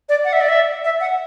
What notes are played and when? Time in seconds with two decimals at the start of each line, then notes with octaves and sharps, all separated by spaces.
0.09 D5
0.24 F#5
0.33 E5
0.41 D5
0.49 E5
0.84 E5
1.01 F#5